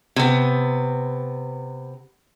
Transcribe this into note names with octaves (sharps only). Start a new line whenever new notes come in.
C3 B3